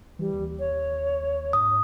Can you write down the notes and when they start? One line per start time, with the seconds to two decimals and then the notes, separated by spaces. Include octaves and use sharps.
0.19 E3 G3
0.33 D#2
0.59 C#5
1.53 G#2 D#6